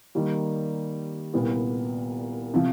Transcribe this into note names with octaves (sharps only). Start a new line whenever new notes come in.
D#3 G3 A#3
C2 A#2 G3 B3
C3 F3